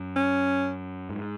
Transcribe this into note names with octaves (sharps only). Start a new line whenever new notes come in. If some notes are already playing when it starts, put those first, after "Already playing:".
Already playing: F#2
C#4
G#2